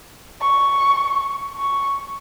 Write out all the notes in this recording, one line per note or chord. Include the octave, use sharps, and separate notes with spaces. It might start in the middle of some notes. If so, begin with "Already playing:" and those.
C#6
C#6